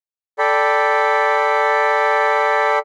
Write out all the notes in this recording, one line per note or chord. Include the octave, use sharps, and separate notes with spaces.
A4 D5 G5 B5